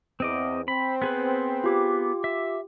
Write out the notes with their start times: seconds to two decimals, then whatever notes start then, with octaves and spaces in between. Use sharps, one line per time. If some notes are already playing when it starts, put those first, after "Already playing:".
0.20 E2 C4 D#5 D6
0.68 C4 B5
1.02 B3 G#4 B4
1.64 F4 G4 D6
2.24 E5